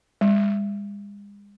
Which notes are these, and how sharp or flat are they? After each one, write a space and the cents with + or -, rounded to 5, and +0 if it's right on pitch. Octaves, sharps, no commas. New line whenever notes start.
G#3 -45